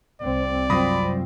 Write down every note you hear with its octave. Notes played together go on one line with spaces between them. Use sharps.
C2 C4 D5
C2 F#2 C4 F4 B5 D#6 A#6